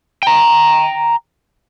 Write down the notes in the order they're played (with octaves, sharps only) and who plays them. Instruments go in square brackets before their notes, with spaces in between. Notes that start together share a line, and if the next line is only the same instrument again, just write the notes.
[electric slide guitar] G5 A#5